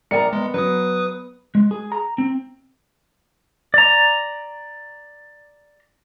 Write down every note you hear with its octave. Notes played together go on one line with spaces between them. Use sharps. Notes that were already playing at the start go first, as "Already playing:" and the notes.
A#1 A#4 D5 G#5 A#5 C#7
G#3 B3
F#3 B4 D#6
G#3
G#4
A#5
C4
D5 A#5